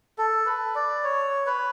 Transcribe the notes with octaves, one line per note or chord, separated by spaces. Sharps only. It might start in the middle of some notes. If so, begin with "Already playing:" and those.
A4
B4
D5
C#5
B4